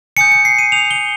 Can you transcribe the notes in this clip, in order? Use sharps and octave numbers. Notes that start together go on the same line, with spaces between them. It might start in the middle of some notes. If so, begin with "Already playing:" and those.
G#5 D#6 G6 C#7
C#7
C7
D#7
G#5 D#6 G6 F7
G7